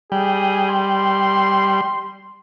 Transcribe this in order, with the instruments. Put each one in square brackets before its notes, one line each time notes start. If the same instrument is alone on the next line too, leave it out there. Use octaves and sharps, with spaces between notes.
[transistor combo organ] G3 [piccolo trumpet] G#4
[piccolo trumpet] C6